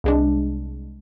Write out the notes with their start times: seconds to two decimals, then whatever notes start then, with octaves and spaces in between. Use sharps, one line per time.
0.04 C2 G#3 D4